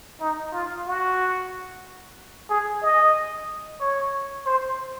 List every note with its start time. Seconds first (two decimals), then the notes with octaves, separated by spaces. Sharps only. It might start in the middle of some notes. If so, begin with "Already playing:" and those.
0.21 D#4
0.53 F4
0.86 F#4
2.50 G#4
2.83 D#5
3.81 C#5
4.46 C5